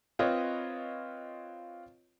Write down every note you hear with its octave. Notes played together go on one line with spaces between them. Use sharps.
C4 F4 B4 C#5 D#5